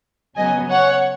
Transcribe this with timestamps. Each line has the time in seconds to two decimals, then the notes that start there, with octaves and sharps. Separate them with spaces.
0.36 C#3 F#3 B3 D#5 G#5
0.70 C#5 F#5